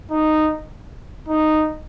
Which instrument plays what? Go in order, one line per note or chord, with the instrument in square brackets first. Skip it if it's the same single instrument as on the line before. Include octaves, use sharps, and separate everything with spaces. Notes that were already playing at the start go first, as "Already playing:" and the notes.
[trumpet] D#4
D#4